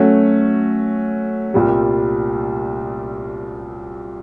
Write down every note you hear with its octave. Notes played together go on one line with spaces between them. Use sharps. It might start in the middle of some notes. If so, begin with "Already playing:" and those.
Already playing: F#3 A3 C#4 F#4
C2 A#2 G3